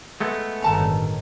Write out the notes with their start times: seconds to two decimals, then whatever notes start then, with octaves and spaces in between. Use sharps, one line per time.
0.20 G#3 A3 B3
0.62 G1 A2 D#3 A4 A5 A#5